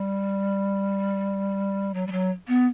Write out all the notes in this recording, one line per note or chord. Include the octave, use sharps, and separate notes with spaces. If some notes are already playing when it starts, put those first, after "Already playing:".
Already playing: G3
F#3
G3
F#3
B3